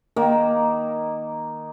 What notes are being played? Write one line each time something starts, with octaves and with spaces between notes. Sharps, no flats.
D#3 A#3